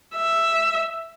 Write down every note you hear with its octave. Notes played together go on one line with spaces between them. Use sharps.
E5